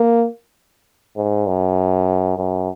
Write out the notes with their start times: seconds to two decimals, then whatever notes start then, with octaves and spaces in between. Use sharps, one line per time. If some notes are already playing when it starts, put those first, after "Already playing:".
Already playing: A#3
1.16 G#2
1.47 F#2
2.38 F#2